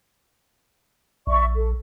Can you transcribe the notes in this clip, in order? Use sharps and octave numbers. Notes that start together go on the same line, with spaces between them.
A#1 D5 E5 C#6
A4